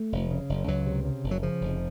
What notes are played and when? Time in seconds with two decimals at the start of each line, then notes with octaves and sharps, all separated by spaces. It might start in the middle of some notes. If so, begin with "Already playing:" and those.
Already playing: A3
0.12 F1
0.31 C#3
0.49 F#1
0.68 C#2 F#3
0.86 C3
1.05 C#3
1.24 F#1
1.31 F#3
1.42 C#3 F3
1.61 F1